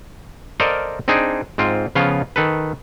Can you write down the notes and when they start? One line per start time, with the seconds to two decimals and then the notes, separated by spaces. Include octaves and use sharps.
0.60 A4 A#4 C5 D5 D#5 F5
1.08 C4 D4 D#4 G#4
1.58 G#2 C4 F4
1.95 C#3 F3 B3 F4 C#5
2.36 D#3 A4 B4